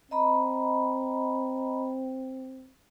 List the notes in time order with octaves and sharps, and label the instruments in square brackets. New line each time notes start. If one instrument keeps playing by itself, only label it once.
[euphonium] C4 [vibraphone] D#5 A#5 B5